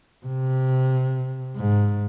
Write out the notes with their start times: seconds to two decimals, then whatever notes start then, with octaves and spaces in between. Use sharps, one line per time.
0.26 C3
1.57 G#2